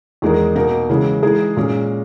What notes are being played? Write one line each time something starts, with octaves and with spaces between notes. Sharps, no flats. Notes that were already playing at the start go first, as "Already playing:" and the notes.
E2 D#3 G#3 D#4 A#4
B2 A#3 D#4 A#4
C#3 E3 G#3 C#4
E3 G#3 D#4 G#4
A#2 G#3 C#4